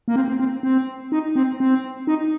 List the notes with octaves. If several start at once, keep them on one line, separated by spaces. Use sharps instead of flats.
A#3
C4
C4
C4
C4
D#4
C4
C4
D#4